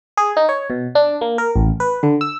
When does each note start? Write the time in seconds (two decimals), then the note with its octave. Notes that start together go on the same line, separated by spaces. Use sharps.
0.17 G#4
0.37 D#4
0.49 C#5
0.70 B2
0.95 D4
1.21 A#3
1.38 A#4
1.56 A1
1.80 B4
2.03 D3
2.21 E6